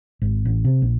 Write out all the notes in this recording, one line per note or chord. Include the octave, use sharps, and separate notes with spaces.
G#1
A1
C3
A#1